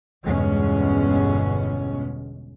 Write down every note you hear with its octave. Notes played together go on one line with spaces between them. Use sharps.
G1 E2 B2 G#3 C#4